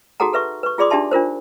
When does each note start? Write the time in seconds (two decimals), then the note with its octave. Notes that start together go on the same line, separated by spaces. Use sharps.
0.20 D#4 F#4 G#4 A4 F#5 A#5
0.33 A4 B4 E5 C#6
0.63 B4 C#6
0.78 F4 G#4 D5 C6 D6 D#6
0.90 D4 D#4 G4 E5 A5 C6
1.11 D4 F4 A#4 C5